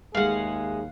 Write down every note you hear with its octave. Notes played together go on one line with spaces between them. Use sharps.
D#2 G#3 A3 G#4 F5 F#5